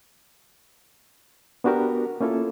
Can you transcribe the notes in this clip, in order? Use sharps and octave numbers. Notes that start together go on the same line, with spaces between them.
B3 D4 F#4 G4 A#4
A#3 C#4 E4 F4 A4